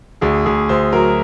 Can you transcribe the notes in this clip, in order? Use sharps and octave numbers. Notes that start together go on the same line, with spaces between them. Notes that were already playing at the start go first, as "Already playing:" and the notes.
D2 G#4
D2 G#4
D2 C5
F#3 A#4